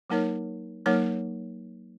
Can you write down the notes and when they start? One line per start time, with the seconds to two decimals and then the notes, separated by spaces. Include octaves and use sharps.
0.10 F#3 A#3 D#4 A#4 C#5
0.86 F#3 A#3 D#4 A#4 C#5